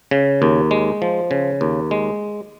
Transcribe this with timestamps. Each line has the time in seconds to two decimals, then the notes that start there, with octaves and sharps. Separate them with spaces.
0.11 C#3
0.42 D#2
0.71 G#3
1.02 F3
1.31 C#3
1.61 D#2
1.91 G#3